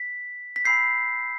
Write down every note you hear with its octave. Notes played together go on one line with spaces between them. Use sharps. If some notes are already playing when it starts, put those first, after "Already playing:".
Already playing: B6
B6
G#5 B5 E6 G6 C7